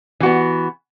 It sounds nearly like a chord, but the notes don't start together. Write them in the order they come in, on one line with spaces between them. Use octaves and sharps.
E3 F#4 B3